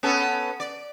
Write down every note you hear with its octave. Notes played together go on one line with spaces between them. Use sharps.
B3 C#4 A4
D5